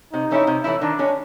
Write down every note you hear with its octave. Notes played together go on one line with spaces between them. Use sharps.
C3 D#4
E3 A3 C#4 E4
C3
E3 A3 C#4 E4
D#3 D4
G#3 C#4